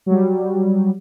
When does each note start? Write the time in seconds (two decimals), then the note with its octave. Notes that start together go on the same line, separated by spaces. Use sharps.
0.06 F#3 G3